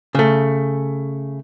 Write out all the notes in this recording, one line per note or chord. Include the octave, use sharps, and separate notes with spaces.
C#3 A3